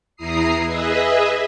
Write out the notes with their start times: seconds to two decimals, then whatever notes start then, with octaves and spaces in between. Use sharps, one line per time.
0.16 E2 E4 A#5 D#6 C7
0.64 G#4 B4 D#5 E5